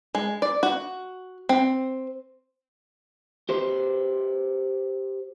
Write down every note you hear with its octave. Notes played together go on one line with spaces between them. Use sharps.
G#3
D5
F#4
C4
G4 B4 C5